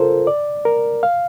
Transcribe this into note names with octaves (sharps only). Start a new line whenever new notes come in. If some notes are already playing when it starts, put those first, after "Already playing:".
Already playing: F4 A4 A#4 C5
D5
A#4
F5